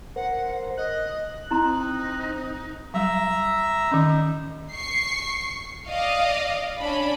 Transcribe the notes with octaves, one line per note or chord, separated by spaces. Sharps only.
A#4 C5 F#5
D#5 F#6
C4 D#4 E4 A#5 C6
F#3 G3 E5 A#5
D#3 C#4 D#4
C#6 C7
D5 D#5 F5
C#4 D4 B5